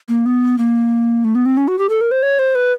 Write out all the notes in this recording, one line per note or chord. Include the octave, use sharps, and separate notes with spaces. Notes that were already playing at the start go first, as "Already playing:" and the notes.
A#3
B3
A#3
A3
B3
C4
C#4
F#4
G4
A4
A#4
C5
C#5
C5
B4